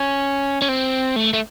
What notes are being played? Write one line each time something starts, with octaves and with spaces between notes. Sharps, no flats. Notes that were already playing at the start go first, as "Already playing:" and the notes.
Already playing: C#4
C#4
C4
A3
A3